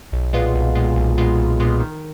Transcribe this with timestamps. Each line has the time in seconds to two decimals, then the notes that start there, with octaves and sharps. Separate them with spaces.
0.12 B1
0.33 A#2 G#3 B3 F4
0.55 B1
0.75 A#2 G#3 B3 F4
0.96 B1
1.18 A#2 G#3 B3 F4
1.38 B1
1.60 A#2 G#3 B3 F4
1.80 D#3